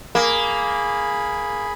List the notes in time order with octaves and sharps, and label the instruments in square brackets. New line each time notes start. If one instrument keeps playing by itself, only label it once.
[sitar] A#3 [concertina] G#4 B5